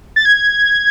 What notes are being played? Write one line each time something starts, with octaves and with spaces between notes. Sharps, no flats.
A6
G#6